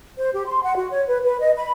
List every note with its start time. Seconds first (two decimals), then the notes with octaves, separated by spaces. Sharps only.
0.18 C5
0.34 G4
0.47 C6
0.63 F#5
0.76 F#4
0.91 C#5
1.07 B4
1.23 B4
1.40 D#5
1.57 B5